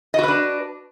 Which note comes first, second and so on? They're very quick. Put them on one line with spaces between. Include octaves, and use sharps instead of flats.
D#5 F#4 B4 D4